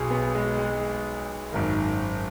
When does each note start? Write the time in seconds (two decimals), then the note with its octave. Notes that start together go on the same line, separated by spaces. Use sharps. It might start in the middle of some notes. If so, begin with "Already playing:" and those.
Already playing: B1 B2 G#4
0.10 B3
0.35 G#3
0.58 G#3
1.52 G#1 F#2 D#3